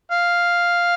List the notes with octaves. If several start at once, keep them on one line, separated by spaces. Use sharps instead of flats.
F5